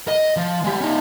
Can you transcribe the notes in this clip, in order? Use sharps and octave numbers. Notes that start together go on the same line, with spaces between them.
D#5
F3
G#3 G4
C#4 D#4